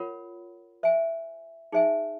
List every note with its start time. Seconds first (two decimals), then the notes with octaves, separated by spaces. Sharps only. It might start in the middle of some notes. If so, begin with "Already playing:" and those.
Already playing: F4 A#4 C#5 F#5 B5
0.83 C5 E5 G#5
1.72 D#4 G#4 C5 E5 G#5